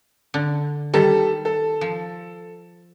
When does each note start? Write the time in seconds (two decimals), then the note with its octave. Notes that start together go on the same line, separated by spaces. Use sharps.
0.34 D3
0.94 D#3 G3 A4
1.45 A4
1.81 F3